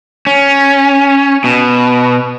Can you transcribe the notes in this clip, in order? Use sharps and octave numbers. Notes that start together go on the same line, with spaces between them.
C#4
B2